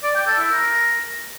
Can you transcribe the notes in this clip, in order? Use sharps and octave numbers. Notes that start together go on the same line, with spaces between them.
D5
G5
A4
E4
A#4